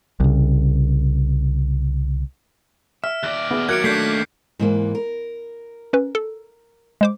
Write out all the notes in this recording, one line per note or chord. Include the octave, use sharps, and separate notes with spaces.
C2 C#3
E5 F6
D#2 D5 F#6
B3 G#4
F#3 A#4 F#6 G#6 C#7 D7
A3 D4 G6 B6 C7
G#2 E3 A#3
A#4
C#4 B4
A4
G#3 C5 D6